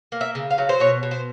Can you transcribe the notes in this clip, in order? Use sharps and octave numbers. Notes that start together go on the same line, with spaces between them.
A#3
E5
C#3
F5
F#3
C5
B2 C#5
B2
C5